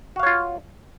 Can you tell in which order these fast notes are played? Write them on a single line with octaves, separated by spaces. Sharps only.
F#4 F5 C#5 F4